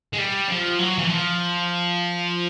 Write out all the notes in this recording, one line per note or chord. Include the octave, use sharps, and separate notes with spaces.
G#3
G3
F3
F#3
E3
F3